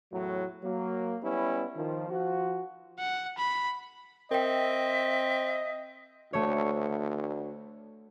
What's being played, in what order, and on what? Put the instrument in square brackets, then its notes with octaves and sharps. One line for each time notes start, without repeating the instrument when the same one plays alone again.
[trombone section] E2 A2 F#3
F#3 A#3
G3 B3 C#4 E4
D#3 F3
F3 F#4
[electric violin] F#5
B5
[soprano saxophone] C4 [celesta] A#4 G5 [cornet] D#5 [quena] E5
[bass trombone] D2 [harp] A3 C#5